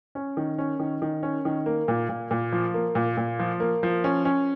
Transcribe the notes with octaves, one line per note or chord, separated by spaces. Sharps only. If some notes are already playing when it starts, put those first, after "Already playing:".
C#4
D#3
C#4
D#3
D#3
C#4
D#3
A#3
A#2
A#2
A#2
F3
A#3
A#2
A#2
F3
A#3
F3
C#4
C#4